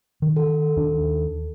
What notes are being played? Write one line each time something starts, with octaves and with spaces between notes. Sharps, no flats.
D#3
A4
D#2 D#3 D4